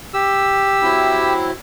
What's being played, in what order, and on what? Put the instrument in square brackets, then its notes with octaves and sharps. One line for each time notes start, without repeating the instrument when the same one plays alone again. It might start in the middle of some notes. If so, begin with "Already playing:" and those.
[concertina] G4 E6
[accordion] F#3 C4 E4